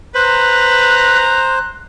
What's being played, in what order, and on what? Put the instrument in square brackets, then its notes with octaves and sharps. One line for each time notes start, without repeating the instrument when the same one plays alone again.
[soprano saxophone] B4 [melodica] C5 [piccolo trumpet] A#5 [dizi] F#6